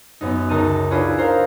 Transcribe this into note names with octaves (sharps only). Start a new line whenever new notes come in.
F#2 B3 D#4
C#2 D#4 A#4 A5 D#7
D4 E4 F4 G#4 B4 C#5
A4 A#4 C5 F5 A#5